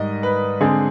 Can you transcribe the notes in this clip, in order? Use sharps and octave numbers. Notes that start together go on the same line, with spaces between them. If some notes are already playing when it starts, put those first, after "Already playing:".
Already playing: G#2 D#3 G3 D#5
B4
D3 G#3 C4 G#4